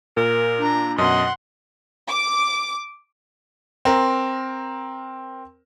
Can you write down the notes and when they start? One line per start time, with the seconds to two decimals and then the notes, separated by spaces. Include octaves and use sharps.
0.17 A#2 A#4
0.59 D4 A#5
0.98 F#2 B2 D#5 F#5 C6
2.08 D6
3.85 C4 A#4